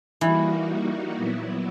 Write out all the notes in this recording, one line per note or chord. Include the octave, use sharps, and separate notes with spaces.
E3 G3 A#3 D#4 F#4
A#2 F#3 B3 E4